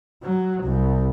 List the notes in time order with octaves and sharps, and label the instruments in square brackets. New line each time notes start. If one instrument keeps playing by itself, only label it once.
[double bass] F#3
C2